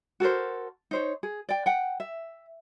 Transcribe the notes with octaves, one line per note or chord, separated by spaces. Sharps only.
F#4 A4 A#4 C5
D#4 C5 C#5
G#4
D5 G5
F#5 G5
E5